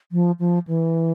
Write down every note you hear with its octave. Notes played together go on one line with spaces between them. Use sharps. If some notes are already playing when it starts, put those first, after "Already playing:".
F3
F3
E3